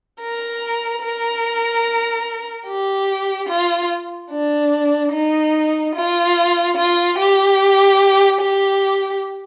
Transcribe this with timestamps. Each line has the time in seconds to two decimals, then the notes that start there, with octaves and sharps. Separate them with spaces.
0.21 A#4
1.02 A#4
2.67 G4
3.49 F4
4.31 D4
5.13 D#4
5.95 F4
6.77 F4
7.18 G4
8.41 G4